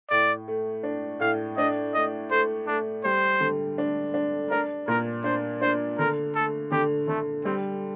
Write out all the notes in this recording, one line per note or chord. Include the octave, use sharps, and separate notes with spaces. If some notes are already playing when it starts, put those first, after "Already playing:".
A2 D5
A3
D4
A2 F5
D4 D#5
A3 D#5
A3 C5
A3 D4
G3 C5
D3
D4
D4
D4 A#4
A#2 A#4
D4 C5
D4 C5
D3 A#4
A3 A4
D3 G4
D3 A3
G3 C4